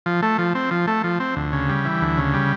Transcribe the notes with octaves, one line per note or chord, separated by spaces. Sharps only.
F3
A3
F3
C4
F3
A3
F3
C4
D2
C#3
G3
E3
D2
C#3
G3